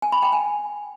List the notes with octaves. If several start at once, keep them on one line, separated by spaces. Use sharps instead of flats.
G#5
B5
G5
G#5